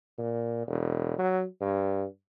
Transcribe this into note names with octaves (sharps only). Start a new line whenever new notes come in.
A#2
E1
F#3
G2